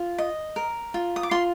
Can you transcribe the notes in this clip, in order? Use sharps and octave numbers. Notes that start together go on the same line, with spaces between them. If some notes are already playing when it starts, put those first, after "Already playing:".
Already playing: F4
D#5
A#4
F4
D#6
D6
F4 C6